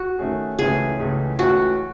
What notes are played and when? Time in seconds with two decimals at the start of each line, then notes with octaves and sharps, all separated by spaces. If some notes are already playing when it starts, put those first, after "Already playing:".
Already playing: F#4
0.19 D#3 A3 C#4 G#4
0.59 C#2 C#3 E3 A3 C#4 G#4
0.99 C#2 C#3 E3 A3 C#4
1.39 C#2 C#3 E3 A3 C#4 F#4